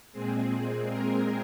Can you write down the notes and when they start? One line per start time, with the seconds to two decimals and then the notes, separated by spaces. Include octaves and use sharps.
0.12 A#2 G#3 C4 G#4
0.87 A#4